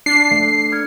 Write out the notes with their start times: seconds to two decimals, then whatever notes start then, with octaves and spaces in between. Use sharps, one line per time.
0.06 D4 C7
0.31 A3
0.72 F6 G#6 C#7